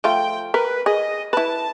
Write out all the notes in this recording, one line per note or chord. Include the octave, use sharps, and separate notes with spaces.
F3 A3 F4 G5
A#4 B4
G#4 D#5
E4 B4 A5